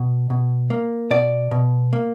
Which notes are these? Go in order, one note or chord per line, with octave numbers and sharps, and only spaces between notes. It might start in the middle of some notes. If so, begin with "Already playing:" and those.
Already playing: B2
B2
A#3
B2 D5
B2
A#3